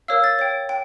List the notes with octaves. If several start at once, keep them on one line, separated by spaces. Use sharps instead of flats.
A#4 C#5 F5 E6
A6
C#5 G5
G5